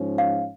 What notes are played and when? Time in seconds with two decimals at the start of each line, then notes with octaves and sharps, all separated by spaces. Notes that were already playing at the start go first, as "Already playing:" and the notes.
Already playing: G#2 F3 C#4
0.18 F5